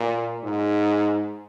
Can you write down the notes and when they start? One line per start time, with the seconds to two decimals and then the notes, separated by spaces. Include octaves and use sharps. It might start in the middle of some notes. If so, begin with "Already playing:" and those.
Already playing: A#2
0.43 G#2